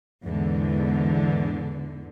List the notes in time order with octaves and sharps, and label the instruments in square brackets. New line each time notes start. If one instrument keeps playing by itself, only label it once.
[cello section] E2 G#2 D3